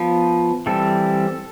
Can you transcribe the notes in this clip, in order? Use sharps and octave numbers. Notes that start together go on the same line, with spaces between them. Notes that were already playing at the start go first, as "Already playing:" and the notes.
Already playing: F3 B3
E3 G3 C4 A4